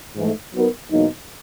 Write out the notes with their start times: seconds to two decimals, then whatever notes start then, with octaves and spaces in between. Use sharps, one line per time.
0.16 G#2 E3 A3
0.54 F#3 B3 D#4 F#4 A#4
0.91 E2 B2 F#3 A#3 D#4